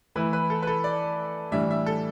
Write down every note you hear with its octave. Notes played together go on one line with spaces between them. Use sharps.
E3 A3 E4 B4
B4
A4
B4
A4
D5
A2 E3 G3 D4 E5
E5
A4